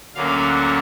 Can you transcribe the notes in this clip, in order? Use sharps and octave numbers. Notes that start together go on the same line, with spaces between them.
D2 D3 F#3 A#3 C#4 F5
F#5